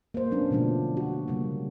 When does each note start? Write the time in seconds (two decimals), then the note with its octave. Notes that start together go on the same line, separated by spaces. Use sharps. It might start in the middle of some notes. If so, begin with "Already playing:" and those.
0.14 A#3 C5
0.31 F#3 B3 C#4 D4
0.51 B2 D3 F3 A3 D4
0.97 F#4
1.28 C#3 F#3 G3 A#3